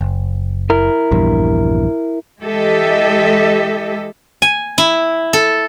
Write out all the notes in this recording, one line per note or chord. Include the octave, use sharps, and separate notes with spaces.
F#1
E4 A#4
A#1 E2 G2
E3 G#3 G4 A4 D#5 E5
G#5
E4
A4